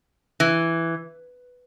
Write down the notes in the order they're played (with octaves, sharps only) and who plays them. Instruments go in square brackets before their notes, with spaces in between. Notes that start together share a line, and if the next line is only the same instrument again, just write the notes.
[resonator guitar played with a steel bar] E3